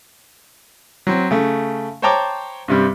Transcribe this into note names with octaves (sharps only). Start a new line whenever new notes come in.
F#3 C4
C#3 A3
C5 C#5 G5 A5 A#5 D6
G2 C3 G3